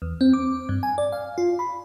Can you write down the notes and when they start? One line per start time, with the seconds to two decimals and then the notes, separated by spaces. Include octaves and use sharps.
0.02 E2
0.21 C4
0.33 D6
0.69 G2
0.83 G#5
0.98 D5
1.12 F5
1.38 F4
1.59 B5